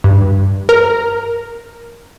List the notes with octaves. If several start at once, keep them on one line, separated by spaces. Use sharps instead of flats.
G2
A#4